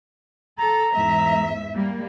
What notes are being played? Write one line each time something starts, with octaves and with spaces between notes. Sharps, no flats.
A4 A#5
E2 G#2 E5
G3 A#3